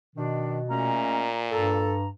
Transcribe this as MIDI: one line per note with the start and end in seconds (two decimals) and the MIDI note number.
0.16 1.00 47
0.16 0.61 51
0.16 0.59 62
0.69 1.92 46
0.69 1.30 56
0.69 1.30 57
0.69 1.30 61
0.69 1.39 82
1.52 2.09 43
1.52 1.94 69
1.52 2.08 82